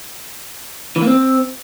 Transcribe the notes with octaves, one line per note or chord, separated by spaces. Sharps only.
E3
A#3
C4